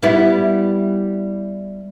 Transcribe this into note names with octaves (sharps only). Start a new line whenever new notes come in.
G3 B3 E4